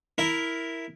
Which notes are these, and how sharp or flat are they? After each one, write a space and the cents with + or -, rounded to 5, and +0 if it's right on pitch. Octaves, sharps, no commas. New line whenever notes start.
E4 +0 A#4 +0